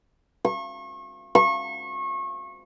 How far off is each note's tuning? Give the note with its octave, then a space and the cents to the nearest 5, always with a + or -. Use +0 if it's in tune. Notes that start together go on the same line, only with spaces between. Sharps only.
C#6 -35
C#6 -30